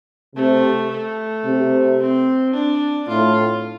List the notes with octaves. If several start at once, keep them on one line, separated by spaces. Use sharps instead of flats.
C3 A3
A3
C3
C4
D4
A2 F4